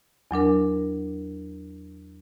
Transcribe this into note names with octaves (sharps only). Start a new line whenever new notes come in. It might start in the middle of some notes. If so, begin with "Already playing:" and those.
E2 F#3 D4 A#4